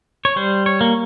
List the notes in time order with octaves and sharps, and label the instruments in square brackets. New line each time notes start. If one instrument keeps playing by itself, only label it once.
[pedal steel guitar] C#5
G3 C5
C#5
A#3